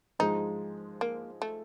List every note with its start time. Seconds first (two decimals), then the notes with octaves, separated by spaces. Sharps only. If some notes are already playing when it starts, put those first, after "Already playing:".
0.19 G#2 F3 G#3 D#4
1.01 A#3
1.42 A3